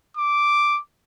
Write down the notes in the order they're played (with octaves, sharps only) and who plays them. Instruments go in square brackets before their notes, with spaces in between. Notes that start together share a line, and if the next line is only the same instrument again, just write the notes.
[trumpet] D6